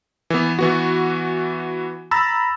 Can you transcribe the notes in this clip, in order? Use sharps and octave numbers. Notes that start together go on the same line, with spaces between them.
E3 B3
E3 B3 F#4
A#5 B5 E6 A6